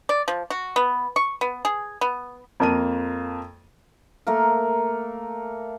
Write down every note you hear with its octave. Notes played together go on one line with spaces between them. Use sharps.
D5
F3
F#4
B3
C#6
B3
G#4
B3
F2 A#3 A5 D#7
A3 A#3 A#4